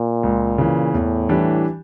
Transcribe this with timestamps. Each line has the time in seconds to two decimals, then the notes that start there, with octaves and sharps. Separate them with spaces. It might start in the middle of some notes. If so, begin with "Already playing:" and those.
Already playing: A#2
0.23 C#2
0.58 C#3 E3
0.94 E2 A2
1.29 E3 G3 D4 G4